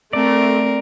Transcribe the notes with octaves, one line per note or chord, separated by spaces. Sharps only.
A3 C4 A#4 D5